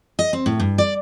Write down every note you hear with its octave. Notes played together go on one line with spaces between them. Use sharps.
D#5
C4
A2
G2
D5